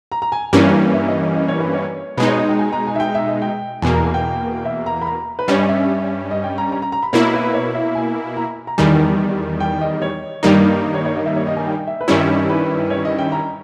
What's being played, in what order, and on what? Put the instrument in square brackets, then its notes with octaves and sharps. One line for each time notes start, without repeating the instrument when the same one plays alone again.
[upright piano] A#5
A#5
G#5
[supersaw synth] G2 E3 G3 A#3 C#4
[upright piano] E5
D#5
D#5
D#5
C#5
B4
C#5
[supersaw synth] B2 G#3 D#4 [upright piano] B4
[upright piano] C#5
D#5
G5
G#5
A#5
G#5
E5
G5
E5
D#5
G5
[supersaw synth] E2 B2 A#3 [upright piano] G#5
[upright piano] A#5
G#5
G5
E5
A#5
B5
A#5
B4
[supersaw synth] G2 G3 C#4 [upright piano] C#5
[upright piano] D#5
E5
D#5
G5
A#5
A#5
A#5
A#5
B5
[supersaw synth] B2 A#3 E4 [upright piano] C#5
[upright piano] B4
C#5
E5
G#5
A#5
A#5
[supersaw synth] E2 D#3 G3 [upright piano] G#5
[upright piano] G5
D#5
C#5
[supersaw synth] G2 D#3 G3 A#3 D#4
[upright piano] D#5
C#5
C#5
D#5
E5
C#5
D#5
G#5
G5
E5
B4
[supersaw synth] G2 D#3 G3 C#4 E4 [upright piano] C#5
[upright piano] D#5
B4
C#5
D#5
G5
A#5